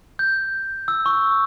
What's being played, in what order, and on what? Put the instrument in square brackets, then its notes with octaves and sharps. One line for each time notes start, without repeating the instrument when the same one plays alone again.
[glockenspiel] G6
E6
C#6